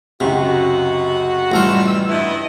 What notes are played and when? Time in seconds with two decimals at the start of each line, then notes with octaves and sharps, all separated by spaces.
0.20 C#2 F#2 C3 F#4
1.52 A1 G3 A3 F4 E6
2.09 G2 B3 E4 D#5